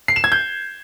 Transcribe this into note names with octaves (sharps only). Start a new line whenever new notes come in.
C7
E7
G#6
G6